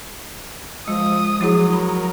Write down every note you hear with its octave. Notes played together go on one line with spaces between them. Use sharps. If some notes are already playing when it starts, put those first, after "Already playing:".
F3 G#3 D#6
F3 F#3 E4 G#4
A#4 B5